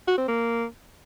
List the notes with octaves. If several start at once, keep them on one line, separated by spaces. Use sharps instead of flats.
F#4
C4
A#3